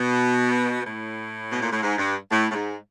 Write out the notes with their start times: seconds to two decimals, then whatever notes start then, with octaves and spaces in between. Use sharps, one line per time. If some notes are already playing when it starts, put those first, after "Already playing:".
Already playing: B2
0.85 A2
1.51 B2
1.62 A#2
1.72 A2
1.82 G#2
1.98 G2
2.31 A2
2.50 A2
2.54 G#2